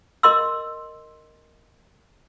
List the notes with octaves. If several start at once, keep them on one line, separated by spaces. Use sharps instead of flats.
A#4 D#5 C6 E6